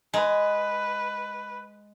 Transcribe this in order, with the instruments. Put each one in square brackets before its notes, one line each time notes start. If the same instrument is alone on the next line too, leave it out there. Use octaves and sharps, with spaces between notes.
[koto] G#3 [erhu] B4